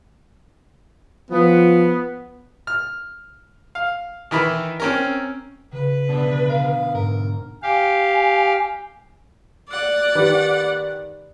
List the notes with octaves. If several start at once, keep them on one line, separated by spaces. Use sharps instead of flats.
F3 B3
F6
F5
D#3 E3 A#4 B4
C4 C#4 A#4
C#3 B4
B2 D3 D4
F5
G#2 A#4
G4 F5 G#5
D5 F#5
D#3 G4 B4